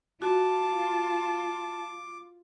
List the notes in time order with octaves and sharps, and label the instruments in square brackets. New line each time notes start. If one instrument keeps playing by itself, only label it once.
[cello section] F4 [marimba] F#4 [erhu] A5 [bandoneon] D6